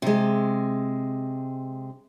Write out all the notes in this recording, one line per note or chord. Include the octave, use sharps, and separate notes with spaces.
C3 G#3